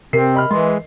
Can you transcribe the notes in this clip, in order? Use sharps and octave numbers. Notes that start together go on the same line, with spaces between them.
C3 C4 A#4 C7
D#5 B5 F6
E3 G#3 D#5 C6